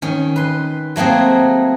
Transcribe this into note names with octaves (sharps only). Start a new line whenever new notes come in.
D#3 C#4
B4 C6
F#3 A3 A#3 C4 G#4